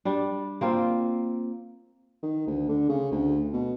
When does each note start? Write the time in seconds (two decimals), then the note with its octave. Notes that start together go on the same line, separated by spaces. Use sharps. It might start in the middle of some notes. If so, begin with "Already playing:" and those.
0.05 G3 D4
0.61 A#3 C4 F4
2.23 D#3
2.47 D2
2.69 D3
2.89 C#3
3.12 D2
3.53 B2